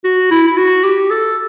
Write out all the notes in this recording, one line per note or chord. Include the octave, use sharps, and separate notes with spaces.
F#4
E4
E4
F#4
G4
A4